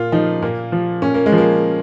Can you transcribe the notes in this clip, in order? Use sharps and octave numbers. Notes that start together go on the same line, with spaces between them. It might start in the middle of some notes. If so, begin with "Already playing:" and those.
Already playing: A#2 F4
F3 D#4
A#2 A#3
F3
A#2 C#4
A#3
G#3
F3
A#3